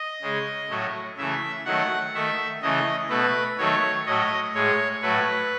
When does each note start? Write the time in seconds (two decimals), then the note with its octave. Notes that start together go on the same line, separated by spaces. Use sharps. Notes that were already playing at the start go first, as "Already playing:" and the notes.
Already playing: D#5
0.22 C#3 G#3
0.69 A2 F#3 A3
1.17 C#3 E3 A3 E5
1.65 D#3 F#3 A3 F#5
2.14 D#3 A3 E5
2.62 C#3 E3 A3 D#5
3.10 B2 A3 B4
3.58 D#3 F#3 A3 C#5
4.06 A2 F#3 A3 D#5
4.54 A2 G#3 C#5
5.02 A2 F#3 A3 B4